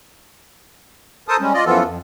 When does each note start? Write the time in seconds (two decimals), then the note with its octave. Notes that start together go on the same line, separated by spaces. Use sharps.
1.28 A4 A#4 C5 A5 D#6
1.40 G3 G#3 C#4
1.54 F4 D5 D#5
1.66 F#2 E3 F3 B3 F4 A4
1.85 F2